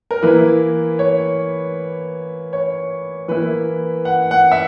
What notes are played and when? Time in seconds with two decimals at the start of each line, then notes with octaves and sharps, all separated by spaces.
0.11 A#4
0.22 E3 A#3 E4 B4
0.99 C#5
2.53 C#5
3.28 E3 A#3 E4 B4
4.05 F#5
4.31 F#5
4.52 E5